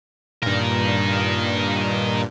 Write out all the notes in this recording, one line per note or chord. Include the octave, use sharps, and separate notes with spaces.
G2 A#2 D#4 A#4